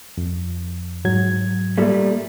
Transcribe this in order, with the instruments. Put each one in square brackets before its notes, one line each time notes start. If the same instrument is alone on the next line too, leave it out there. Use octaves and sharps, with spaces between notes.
[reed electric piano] F2
G#2 F#3 G#6
[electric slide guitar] A#2 G3 A3